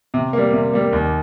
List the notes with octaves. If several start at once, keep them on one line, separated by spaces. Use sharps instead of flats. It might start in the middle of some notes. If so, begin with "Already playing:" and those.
C3
G3 A#3
C3
G3 A#3
D#2